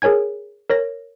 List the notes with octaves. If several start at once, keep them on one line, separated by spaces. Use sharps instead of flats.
G#4 A#4 C#5 G#5 G#6
A#4 C#5 A#6